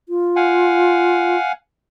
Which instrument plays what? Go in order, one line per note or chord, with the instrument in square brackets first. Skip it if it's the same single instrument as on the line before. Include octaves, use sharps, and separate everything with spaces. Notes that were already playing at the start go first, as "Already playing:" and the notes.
[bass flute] F4
[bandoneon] F5 F#5 G#5